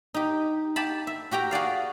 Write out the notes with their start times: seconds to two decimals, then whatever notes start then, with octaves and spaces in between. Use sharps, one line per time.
0.14 D#4 G4
0.76 G4 A5 B5
1.07 E5
1.31 F#4 G4 G5 A#5
1.51 F#4 G#4 D5 F5